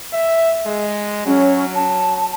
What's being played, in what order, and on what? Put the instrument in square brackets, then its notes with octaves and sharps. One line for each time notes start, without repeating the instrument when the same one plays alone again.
[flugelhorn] E5
G#3
[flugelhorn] F#3 [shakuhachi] C#4
[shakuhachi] A5